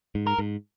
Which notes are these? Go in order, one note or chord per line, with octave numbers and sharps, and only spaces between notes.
G#2
A#4
G#2